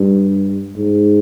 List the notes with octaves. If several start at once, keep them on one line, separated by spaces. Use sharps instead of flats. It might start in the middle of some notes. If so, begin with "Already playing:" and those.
Already playing: G2
G#2